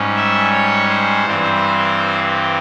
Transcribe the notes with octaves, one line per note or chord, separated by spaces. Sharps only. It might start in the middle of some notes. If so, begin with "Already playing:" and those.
Already playing: G#2 G3 C#4
E5
C#5
C5
G2 E3 G3 C4